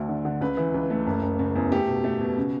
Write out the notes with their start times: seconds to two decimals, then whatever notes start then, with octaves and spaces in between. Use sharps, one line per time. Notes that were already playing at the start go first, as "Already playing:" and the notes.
Already playing: D2 A3
0.09 D3
0.25 D3
0.41 C#2 B4
0.57 E3
0.74 C#2
0.90 A3
1.07 F#1
1.23 F#1
1.39 C#3
1.56 E2
1.72 A3 G4
1.88 B2
2.04 A3
2.21 B2
2.37 C#3